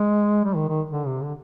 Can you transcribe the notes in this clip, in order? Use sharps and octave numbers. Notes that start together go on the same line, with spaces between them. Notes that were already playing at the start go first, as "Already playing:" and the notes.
Already playing: G#3
G3
D#3
D#3
D3
C3
D3